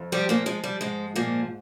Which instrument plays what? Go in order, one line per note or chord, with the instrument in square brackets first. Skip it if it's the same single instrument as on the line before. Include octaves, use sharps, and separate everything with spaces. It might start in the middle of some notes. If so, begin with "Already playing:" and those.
Already playing: [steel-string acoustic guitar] F2
F3 G3 G4
A#2 A#3
F3 G#3
G3
G#2 G#3
A#2 F3 A#3